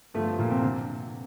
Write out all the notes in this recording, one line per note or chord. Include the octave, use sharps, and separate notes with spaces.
G2 D3 F3 A3
A3
A#2 A#3
C3 C4
D3